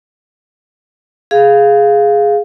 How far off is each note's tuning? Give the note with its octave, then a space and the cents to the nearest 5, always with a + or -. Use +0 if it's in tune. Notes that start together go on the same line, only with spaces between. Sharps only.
G#4 +0 F5 +0